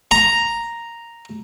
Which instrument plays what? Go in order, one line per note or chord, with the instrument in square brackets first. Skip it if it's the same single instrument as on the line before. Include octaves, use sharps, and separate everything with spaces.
[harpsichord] A#5